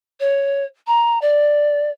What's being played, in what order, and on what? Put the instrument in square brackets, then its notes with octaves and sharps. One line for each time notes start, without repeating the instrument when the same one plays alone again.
[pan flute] C#5
A#5
D5